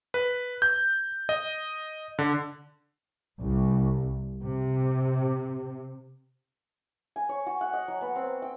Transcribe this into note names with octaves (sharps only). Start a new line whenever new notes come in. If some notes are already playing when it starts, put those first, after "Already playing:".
B4
G6
D#5
D3
C2
C3
G#5
C#5
F#4
F#5
D#5
F#3
B3
C4
G5